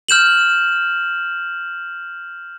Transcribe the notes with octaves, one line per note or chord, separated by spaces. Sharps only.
F6 G6 E7 F#7